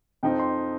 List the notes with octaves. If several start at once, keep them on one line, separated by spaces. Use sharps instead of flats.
F2 F3 D#4 G5
C6